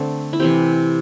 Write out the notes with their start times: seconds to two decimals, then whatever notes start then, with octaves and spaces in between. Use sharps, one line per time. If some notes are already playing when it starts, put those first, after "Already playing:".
Already playing: D3 A3 C4
0.33 E4
0.40 C3 E3 C4 G4